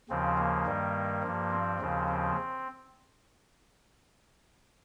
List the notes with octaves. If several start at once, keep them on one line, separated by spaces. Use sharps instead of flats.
D#2 C#3 F3 C4
A#3
G2 D#3 G3
G2 F3
C4
D#2 C#3 F3
C4